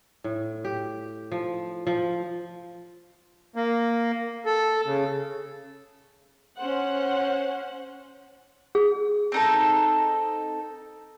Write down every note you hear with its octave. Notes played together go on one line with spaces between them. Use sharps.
A2
G4
F3
F3
A#3
A4
C#3
C#4 C5 F#5
G#4
C4 D#4 A4